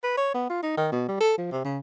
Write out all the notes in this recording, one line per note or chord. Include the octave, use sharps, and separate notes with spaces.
B4
C#5
B3
F4
D#4
D#3
B2
G3
A4
F3
C3
C#3